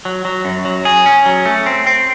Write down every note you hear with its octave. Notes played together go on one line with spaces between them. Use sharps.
F#3
F#3
F#2
F#3
G#4
C#4
F#3
A3
C4
C4